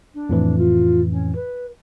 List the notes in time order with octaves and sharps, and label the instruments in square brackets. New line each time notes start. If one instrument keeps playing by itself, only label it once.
[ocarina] D4
[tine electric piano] F2 A2 E3
[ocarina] F4
C#4
B4